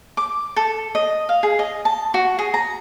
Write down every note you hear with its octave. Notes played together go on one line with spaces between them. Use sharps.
D6
A4
D#5
F5
G#4
D#5
A5
F#4
G#4
A#5